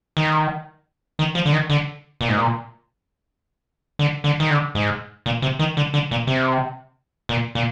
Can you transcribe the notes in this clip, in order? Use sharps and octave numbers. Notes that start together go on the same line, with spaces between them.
D#3
D#3
F3
D3
D#3
D3
A#2
G#2
A#2
D3
D3
D#3
D3
G#2
A#2
C3
D#3
D3
D3
A#2
C3
A#2
A#2